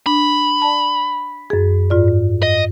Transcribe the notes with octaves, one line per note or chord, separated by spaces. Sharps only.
D4 B5
D5 A5
F#2 G#4
G#2 F4 D5
D#5